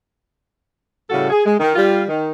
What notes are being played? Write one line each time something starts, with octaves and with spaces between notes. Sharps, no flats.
A2 C#3 G3 F#4 A4
G#4
G#3
D#3
G3 F4
D#3